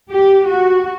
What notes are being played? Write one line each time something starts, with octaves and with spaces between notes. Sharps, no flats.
G4
F#4